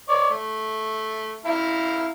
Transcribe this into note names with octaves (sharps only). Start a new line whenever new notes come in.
C#5 D5
A3
E4 F5 A#5